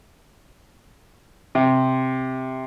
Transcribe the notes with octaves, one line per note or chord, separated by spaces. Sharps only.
C3